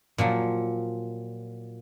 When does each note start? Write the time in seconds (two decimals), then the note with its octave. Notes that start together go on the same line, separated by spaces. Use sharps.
0.18 A#2 F3 F#3